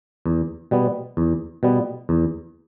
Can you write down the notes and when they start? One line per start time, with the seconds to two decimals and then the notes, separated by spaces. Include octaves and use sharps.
0.26 E2
0.71 B2 G3 B3
1.17 E2
1.63 B2 G3 B3
2.09 E2